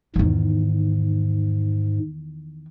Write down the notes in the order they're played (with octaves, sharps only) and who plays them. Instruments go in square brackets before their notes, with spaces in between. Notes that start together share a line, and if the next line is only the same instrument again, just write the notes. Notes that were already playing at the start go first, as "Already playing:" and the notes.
[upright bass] E2 D#3 [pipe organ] G#2